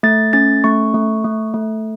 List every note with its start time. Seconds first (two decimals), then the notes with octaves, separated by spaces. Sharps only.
0.03 A3 A6
0.33 C#4 A6
0.64 A3 C#6
0.94 A3
1.25 A3
1.54 A3